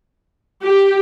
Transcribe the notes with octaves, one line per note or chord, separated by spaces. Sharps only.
G4